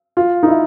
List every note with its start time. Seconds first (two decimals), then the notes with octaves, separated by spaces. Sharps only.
0.17 F4
0.43 D#4
0.48 E4